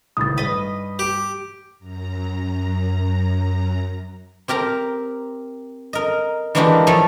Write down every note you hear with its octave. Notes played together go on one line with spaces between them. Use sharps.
G#1 C#2 A2 D#6 A6
G2 B4 D#5
G4
F#2 A#5
C4 G4 A#4 A#5
A#4 D#5
E3 G#3 A#3 D4 F#4 G4
F3 A3 A4 C#5 D#5